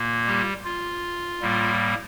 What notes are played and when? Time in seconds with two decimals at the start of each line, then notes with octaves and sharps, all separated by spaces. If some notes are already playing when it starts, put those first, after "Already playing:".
Already playing: A#2 A#3
0.27 G3 G4
0.64 F4
1.41 A2 G3 A#3